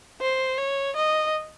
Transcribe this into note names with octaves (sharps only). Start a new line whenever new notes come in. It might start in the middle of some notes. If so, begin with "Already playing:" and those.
C5
C#5
D#5